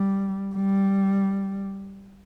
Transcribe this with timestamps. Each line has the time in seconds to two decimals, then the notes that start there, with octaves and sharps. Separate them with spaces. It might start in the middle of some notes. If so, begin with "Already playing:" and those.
Already playing: G3
0.56 G3